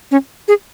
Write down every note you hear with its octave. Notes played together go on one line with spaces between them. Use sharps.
C#4
G#4